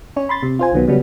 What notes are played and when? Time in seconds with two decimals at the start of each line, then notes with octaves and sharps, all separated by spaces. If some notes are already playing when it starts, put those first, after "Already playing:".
0.16 C#4 C#5
0.29 B5 C6 A6
0.43 C3
0.59 F4 C5 G#5
0.72 B1 D#3 F#3 B3
0.87 C#3 F#3 G3 B3 C#4